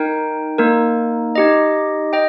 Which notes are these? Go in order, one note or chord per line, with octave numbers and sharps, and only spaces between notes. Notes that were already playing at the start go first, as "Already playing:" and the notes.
Already playing: D#4 A#4 G5
A#3 D#4 A#4
D#4 G4 D#5
D#5 G5